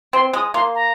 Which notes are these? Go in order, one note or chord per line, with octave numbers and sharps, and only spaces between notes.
C4 C6
G#3 D#6
A#3 C6
A#5